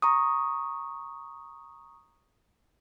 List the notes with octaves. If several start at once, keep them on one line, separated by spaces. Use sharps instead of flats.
A#5 C#6 D#6